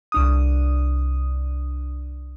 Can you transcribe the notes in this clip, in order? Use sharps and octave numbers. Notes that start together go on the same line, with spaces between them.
C2 D4 D#6